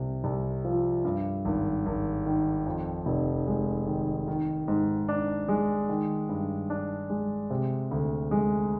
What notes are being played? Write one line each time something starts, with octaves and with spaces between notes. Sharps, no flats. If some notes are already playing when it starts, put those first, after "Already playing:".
Already playing: C2 C3
C2
F3
G2
G#1
G#1
D#3
F2
F1
G#3
D#3
D#3
G#2
D4
G#3
D#3
G2
D4
G#3
C3
D2
G#3